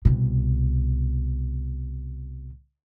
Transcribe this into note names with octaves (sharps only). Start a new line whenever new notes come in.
C2 B2